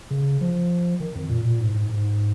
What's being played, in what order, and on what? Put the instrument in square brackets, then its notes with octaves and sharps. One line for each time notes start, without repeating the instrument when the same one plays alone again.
[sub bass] C#3
F3
D#3
F2
A#2
A#2
G#2
G#2
G#2